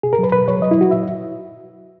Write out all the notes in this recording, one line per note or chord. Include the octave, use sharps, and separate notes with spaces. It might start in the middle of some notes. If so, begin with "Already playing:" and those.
B2 G#4
A#4
F#3 B4
B2 B4
F#3 C#5
F#3 D#5
E4
F#3 F#4
A#2 E5